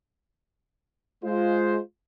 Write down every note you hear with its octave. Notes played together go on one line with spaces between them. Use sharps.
G#3 F4 C5